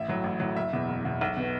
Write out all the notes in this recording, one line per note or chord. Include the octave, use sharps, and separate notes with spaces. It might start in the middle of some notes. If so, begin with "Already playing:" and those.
Already playing: A1 E5
A2 F#3
A1
A2 F#3
F#1 E5
E2 B2
F#1
E2 B2
B1
B2 B3